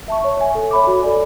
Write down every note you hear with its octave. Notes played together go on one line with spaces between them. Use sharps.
E5 A5 C#6
C#5
E5 G#5
A4
C#5 E5 B5 D6
F#4
A4 D5 G#5